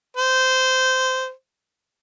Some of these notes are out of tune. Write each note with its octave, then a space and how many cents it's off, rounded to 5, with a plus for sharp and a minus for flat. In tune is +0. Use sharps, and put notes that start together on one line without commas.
C5 -15